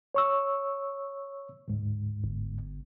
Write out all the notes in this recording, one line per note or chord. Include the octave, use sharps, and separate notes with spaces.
C#5 C#6 E6
D2 G#2
G1